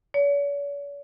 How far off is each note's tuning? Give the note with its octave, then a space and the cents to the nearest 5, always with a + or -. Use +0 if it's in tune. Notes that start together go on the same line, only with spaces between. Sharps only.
C#5 +45